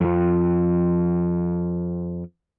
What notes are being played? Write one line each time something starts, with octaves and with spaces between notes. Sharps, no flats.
F2 F3